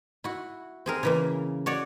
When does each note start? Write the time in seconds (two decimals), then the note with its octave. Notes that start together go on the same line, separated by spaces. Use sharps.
0.24 E4 F#4
0.86 C4 G#4 A#4
1.03 C#3 E3 A#3
1.66 F#4 C#5 D5